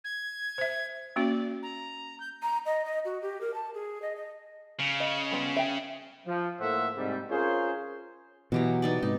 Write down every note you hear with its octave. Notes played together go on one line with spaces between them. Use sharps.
G#6
C5 E5
A#3 C#4 F#4 D5
A#5
G6
A#5
D#5
D#5
F#4
G4
A#4
A5
G#4
D#5
D#5
C#3
D#5
G3 B3 F4
E5 G5
F3
A2 A#3 A4 C5 E5 F#5
G#2 C3 G3
C#4 F4 G#4 A#4 C5 C#5
B2 E3 F#3 G4 A#5
B3 D#4 D5
G#2 C3 D#4